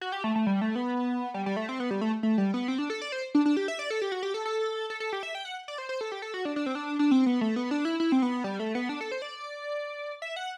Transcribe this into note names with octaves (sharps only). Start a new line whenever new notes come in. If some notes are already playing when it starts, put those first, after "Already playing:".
F#4
G4
A3
A3
G3
A3
B3
G3
G3
A3
C4
B3
G3
A3
A3
G3
B3
C4
D4
A4
D5
C5
D4
D4
G4
E5
D5
A4
G4
F#4
G4
A4
A4
A4
A4
G4
E5
G5
F#5
D5
C5
C5
A4
G4
A4
F#4
D4
D4
C4
D4
D4
C4
B3
A3
B3
D4
E4
E4
C4
B3
G3
A3
B3
D4
A4
C5
D5
E5
F#5